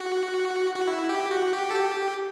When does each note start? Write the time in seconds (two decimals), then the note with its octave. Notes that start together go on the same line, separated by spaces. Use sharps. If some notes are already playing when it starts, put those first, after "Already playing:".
Already playing: F#4
0.76 F#4
0.87 E4
1.09 G4
1.31 F#4
1.53 G4
1.71 A4
1.75 G4